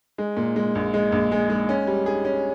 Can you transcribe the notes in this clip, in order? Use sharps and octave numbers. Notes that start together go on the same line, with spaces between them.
G#3
A#2
G#3
A#1
G#3
A#1
G#3
G#3
C#4
G3
G#4
C#4